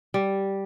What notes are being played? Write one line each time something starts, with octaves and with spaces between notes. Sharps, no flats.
G3